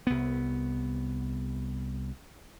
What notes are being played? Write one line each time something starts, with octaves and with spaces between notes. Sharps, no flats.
C2 B3